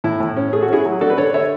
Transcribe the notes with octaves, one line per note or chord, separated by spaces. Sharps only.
A2 E4
A2
C#4
A3 G#4
F#4
C#4 E4 G#4
F#3
D4 F#4 A4
B4
D3 A4 C#5
A3 C#5 E5